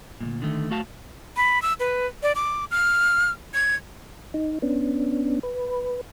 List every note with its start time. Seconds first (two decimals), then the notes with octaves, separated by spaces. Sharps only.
0.21 D2 G2 A#2
0.42 D3 D#3 A3
0.71 A3 F#4 F5 A5
1.37 B5
1.62 E6
1.80 B4
2.23 D5
2.36 D6
2.71 F6
3.54 G#6
4.34 D#4
4.62 B3 C#4 D4
5.43 B4